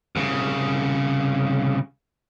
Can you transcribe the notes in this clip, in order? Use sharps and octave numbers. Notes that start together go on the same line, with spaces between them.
C2 C#3